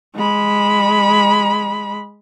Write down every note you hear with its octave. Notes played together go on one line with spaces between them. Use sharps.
G#3 B5